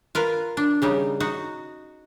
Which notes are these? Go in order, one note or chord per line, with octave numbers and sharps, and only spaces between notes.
F4 A#4 B4
D4
C#3 G3 D#4
D#4 F#4